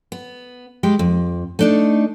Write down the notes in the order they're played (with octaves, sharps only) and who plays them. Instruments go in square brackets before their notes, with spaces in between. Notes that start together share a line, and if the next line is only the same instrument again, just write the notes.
[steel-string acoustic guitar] B3
G3 G#3 G4
F2
A3 D4 D#4